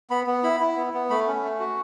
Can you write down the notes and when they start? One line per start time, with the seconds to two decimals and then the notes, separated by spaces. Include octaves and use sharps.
0.10 B3 B5
0.27 B3
0.44 E4 B5
0.60 E4
0.76 B3
0.93 B3
1.10 A3 B5
1.27 C#4
1.43 A3
1.60 F#4